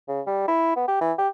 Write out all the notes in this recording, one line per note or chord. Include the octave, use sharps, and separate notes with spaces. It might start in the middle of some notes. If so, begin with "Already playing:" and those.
C#3
G3
E4
B3
G4
E3
G4